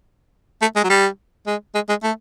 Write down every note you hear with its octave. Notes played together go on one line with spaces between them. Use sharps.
A3
G#3
F#3
G3
G#3
G#3
G#3
A3